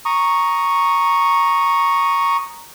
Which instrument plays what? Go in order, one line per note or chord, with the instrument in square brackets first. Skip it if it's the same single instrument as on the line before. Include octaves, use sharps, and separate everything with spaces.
[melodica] A#5 C#6 D#6